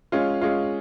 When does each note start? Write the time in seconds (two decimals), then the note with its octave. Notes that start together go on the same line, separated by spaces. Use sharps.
0.12 G#3 C#4 F4
0.41 G#3 C#4 F4